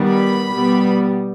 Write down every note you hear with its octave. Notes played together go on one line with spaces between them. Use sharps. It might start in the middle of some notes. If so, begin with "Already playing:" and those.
Already playing: D#3 G3 B3
B5
B2 G3 B3